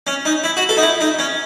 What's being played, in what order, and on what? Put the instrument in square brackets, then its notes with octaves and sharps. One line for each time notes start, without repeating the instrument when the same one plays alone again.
[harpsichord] C#4
D#4
E4
F#4
A4
D#4
E4
D#4
C#4